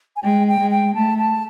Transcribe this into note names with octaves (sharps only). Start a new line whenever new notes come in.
G#5
G#3 G5
G5
G#3
G5
A3 A5
A5